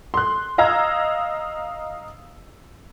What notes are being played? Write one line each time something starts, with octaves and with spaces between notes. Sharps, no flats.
C6 F#6
D#5 F5 A#5 E6 G#6